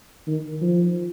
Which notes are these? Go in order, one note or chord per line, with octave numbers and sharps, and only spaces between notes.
D#3
F3